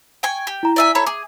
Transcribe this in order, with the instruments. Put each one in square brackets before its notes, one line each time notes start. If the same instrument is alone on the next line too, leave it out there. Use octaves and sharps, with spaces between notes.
[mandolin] G5 G#5 C#6
G4
[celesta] E4 A#5
[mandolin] D5 E5 G#5
[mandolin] E4 A4 C#5 [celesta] A#5
[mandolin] G#4 [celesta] D6